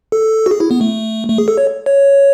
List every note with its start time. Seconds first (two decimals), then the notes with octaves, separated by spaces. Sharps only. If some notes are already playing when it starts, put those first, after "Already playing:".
0.12 A4
0.46 F#4
0.51 G#4
0.60 E4
0.71 B3
0.81 A3
1.29 A3
1.38 G#4
1.48 A4
1.58 C#5
1.86 C#5